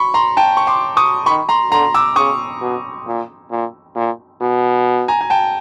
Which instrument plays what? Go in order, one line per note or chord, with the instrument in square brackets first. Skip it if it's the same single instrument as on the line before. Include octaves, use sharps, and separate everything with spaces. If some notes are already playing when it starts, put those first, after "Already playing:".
Already playing: [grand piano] B5 C#6
A#5 C6
G5 A5
C#6
C6 D6
C#6 D#6
[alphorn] D#3 [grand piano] B5 C#6
[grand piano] A#5 C6
[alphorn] D3 [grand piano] A#5 C6
[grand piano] D6 E6
[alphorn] C#3 [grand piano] C#6 D#6
[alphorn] B2
A#2
A#2
A#2
B2
[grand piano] G#5 A#5
G#5
G5 A5